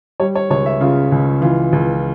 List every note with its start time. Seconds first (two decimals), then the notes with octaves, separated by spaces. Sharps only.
0.20 G3 C#5
0.35 C#5
0.50 C#2 C#5
0.66 E5
0.80 C#3 F4
1.12 C#2
1.42 E3 F4
1.73 C#2